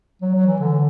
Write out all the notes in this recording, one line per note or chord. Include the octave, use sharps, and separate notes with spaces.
F#3
F#3
E3
D3